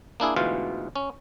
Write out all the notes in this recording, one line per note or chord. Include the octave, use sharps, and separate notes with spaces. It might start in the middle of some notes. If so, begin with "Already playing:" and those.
A#3 D4 E4 G#4
D2 G#2 B2 E3 F4 F5
C#4